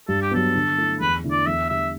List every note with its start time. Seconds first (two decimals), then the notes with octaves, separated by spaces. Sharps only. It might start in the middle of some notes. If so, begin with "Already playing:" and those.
0.08 G2 A4
0.22 G4
0.31 F#3 B3 A4
0.55 D3
0.78 A3 E4
1.00 E2 B4
1.24 D3 A3 E4
1.31 D5
1.46 E2 E5
1.70 D3 G3 E5